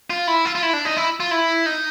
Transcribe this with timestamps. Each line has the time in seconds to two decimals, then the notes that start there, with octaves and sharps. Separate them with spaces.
0.10 F4
0.27 E4
0.45 F4
0.55 F4
0.62 E4
0.73 D4
0.85 D#4
0.97 E4
1.20 F4
1.31 E4
1.66 D#4